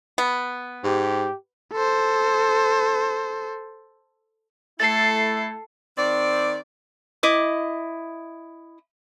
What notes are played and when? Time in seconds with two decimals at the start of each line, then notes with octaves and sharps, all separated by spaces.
0.18 B3
0.84 G#2 G4
1.73 A4 C5
4.80 A3 E4 A4 A6 C7
5.98 D#3 C4 D5
7.23 E4 D#5 D6